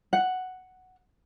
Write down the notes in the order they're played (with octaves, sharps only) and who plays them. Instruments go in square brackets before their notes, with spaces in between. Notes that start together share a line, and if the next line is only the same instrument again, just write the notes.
[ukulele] F#5